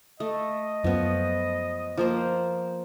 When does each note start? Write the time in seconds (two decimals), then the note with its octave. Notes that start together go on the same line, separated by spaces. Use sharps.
0.20 A3 D#5
0.84 F#2 F3 B3
1.97 F3 A#3 C5